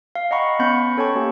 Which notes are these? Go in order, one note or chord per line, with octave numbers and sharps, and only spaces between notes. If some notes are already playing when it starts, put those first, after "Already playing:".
F5
D#5 F#5 G5 A#5 B5 C#6
B3 C#4 B5 G6 C#7
B5
C#4 A4 C#5 G5 A5 C#6
A#3 C#4 G4 A4